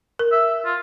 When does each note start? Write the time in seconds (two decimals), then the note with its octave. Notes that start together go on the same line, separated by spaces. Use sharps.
0.19 A#4
0.32 E5
0.65 F4